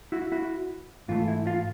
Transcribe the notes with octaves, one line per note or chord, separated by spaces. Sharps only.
E4 F#4
E4 F#4
G#2 E3 A3 F4
E4
F4